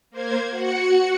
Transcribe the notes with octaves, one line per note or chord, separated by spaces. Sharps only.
A#3 C5 G#6
F#4 F#5 C#7